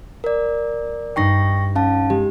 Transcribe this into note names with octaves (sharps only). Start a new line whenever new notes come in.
A#4 D5
G2 D#4 G5 C#6 A#6 C7
C#4 F5 A5
G#3 G4